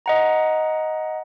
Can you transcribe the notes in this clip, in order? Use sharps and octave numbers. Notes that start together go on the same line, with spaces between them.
D#5 F#5 A#5